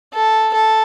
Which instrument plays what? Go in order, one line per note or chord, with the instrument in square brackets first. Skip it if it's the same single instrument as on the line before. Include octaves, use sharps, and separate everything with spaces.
[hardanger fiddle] A4
A4